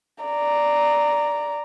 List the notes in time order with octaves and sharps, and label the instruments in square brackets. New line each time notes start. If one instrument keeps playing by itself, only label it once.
[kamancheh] D5 A#5